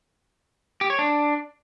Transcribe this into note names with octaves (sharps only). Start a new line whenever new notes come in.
G4
C#5
D4